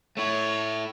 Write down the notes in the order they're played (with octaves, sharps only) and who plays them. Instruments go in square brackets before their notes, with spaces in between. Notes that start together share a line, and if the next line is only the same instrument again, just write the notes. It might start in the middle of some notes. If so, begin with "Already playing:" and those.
[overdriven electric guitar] A3 E4 [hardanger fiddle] C#5